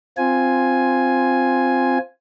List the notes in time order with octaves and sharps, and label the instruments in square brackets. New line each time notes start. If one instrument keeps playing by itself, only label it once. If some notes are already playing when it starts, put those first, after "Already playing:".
[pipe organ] C4 F4 G#5